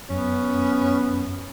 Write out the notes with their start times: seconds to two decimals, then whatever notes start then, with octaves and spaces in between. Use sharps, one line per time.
0.10 F#2 B3 C#4